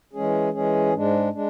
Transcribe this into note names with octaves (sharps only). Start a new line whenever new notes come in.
E3 G#3 C#4 G#4
E3 G#3 C#4 G#4
G#2 G#3 D4
G#3 D4